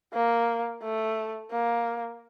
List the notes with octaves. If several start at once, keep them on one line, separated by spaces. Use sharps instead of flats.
A#3
A3
A#3